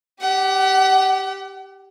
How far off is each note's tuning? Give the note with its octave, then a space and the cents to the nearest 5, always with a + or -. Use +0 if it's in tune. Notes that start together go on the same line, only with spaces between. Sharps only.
G4 +0 F#5 +35